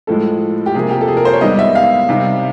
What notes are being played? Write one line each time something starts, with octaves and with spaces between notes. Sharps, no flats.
A2 F3 G#3 A4
G4
C3 F3 A#3 G#4
G4
A4
G#4
A#4
C5
C#5
G#2 D#3 G3 B3 D#5
E5
F5
C3 D#3 G3